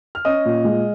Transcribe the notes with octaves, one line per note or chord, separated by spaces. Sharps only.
F6
C#4 D#5 D#6
A#2
G#3